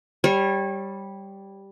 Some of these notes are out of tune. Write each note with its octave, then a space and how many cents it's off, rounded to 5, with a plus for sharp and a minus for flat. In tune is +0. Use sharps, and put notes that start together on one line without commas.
G3 +0 C#5 -25